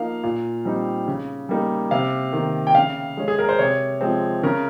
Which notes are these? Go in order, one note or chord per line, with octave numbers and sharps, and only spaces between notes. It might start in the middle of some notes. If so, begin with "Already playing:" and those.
Already playing: F3 A#3 D#4 F5
A#2
G3 C4 D#4
C#3
G3 A#3 D#4
C3 F5
D#3 A#3
G5
C#3 F5
G#3 C#4
G#4
A#4
C5
C3 C#5
F3 G#3 C4
C#3 A#4